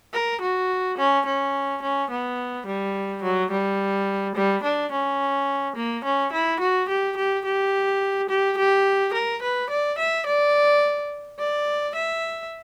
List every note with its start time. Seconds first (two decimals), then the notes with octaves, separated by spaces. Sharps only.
0.13 A#4
0.41 F#4
0.98 C#4
1.26 C#4
1.82 C#4
2.11 B3
2.67 G3
3.23 F#3
3.51 G3
4.35 G3
4.63 D4
4.92 C#4
5.76 A#3
6.04 C#4
6.33 E4
6.60 F#4
6.89 G4
7.17 G4
7.45 G4
8.29 G4
8.58 G4
9.14 A#4
9.42 B4
9.70 D5
9.98 E5
10.26 D5
11.39 D5
11.95 E5